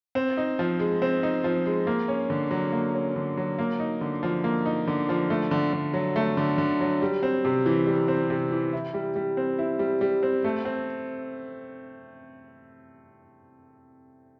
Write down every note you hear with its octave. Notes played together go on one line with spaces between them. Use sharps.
C4
D#4
F3
G#3
C4
D#4
F3
G#3
A#3
C#4
D3
F#3
A#3
C#4
D3
F#3
A#3
D#4
D3
F3
A#3
D#4
D3
F3
A3
D3
D3
F#3
A3
D3
D3
F#3
G3
C4
C3
E3
G3
C4
C3
E3
E4
G3
G3
C4
E4
G3
G3
C4
A3
C4